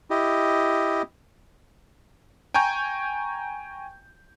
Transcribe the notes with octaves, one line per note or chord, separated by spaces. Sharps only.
E4 G4 D#5
G5 G#5 A#5 C#6 G6